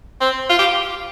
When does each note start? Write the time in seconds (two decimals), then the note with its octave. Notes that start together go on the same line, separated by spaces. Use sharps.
0.21 C4
0.50 F4
0.59 G4